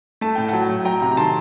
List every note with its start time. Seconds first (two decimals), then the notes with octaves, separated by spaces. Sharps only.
0.21 A3 A5
0.35 A2 G5
0.48 F#3 F#5 A5
0.69 A2
0.85 F#3 G5 A#5
1.01 C3 G5 A#5
1.12 A#5
1.17 D#3 A5 C6